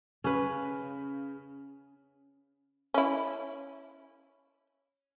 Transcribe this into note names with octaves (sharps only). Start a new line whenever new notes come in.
C#3 C#4 B4
C#4 E4